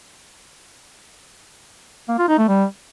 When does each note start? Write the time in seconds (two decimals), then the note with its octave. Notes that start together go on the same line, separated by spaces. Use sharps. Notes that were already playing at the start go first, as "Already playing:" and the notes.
2.09 A#3
2.19 F4
2.28 D#4
2.38 A3
2.48 G3